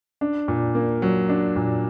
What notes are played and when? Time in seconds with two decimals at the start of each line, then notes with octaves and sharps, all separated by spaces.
0.21 D4
0.48 A#2
0.75 A#3
1.02 F#3
1.29 D4
1.56 A#2